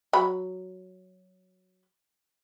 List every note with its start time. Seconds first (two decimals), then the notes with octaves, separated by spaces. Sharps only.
0.13 F#3 B5